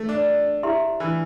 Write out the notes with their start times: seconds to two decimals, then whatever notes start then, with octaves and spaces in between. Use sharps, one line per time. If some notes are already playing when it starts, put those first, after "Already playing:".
Already playing: A3
0.09 D4
0.63 E4 G4 E5 C6
1.00 E3